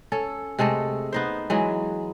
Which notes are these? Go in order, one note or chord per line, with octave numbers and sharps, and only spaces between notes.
C#4 A4
C3 G#3 A3 A4
B3 D#4 C5
E3 F#3 G#3